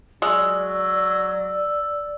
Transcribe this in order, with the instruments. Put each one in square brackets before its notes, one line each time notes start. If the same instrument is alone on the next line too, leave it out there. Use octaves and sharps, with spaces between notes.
[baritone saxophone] F#3 [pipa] G#3 [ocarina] D5 [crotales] E6